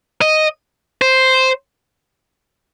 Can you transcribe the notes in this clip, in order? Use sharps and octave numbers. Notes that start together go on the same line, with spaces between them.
D#5
C5